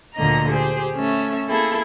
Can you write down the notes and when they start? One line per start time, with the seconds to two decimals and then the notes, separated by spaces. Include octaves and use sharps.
0.15 D2 A#2 D3 A#3 D#5 A#5
0.49 G4 G#4 C5
0.94 A3 C#4 E5
1.48 A#3 E4 G#4 A4